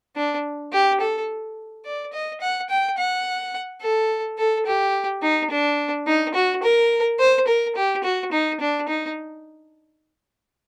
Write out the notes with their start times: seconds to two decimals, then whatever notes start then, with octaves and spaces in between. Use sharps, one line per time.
0.16 D4
0.72 G4
1.01 A4
1.85 D5
2.13 D#5
2.41 F#5
2.69 G5
2.98 F#5
3.82 A4
4.38 A4
4.66 G4
5.23 D#4
5.50 D4
6.07 D#4
6.34 F#4
6.63 A#4
7.19 C5
7.47 A#4
7.76 G4
8.04 F#4
8.32 D#4
8.60 D4
8.88 D#4